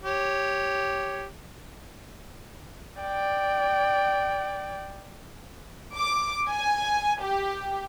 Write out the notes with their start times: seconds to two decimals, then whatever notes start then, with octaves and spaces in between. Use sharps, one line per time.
0.04 G4 C#5
3.02 D5 G5
5.96 D6
6.49 G#5
7.22 G4